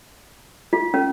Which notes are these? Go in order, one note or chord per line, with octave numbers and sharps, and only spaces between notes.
F4
C#4